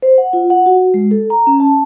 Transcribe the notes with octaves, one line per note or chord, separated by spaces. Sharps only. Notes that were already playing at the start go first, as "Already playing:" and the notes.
C5
F#5
F4
F#5
F#4
G#3
A4
A#5
C#4
A5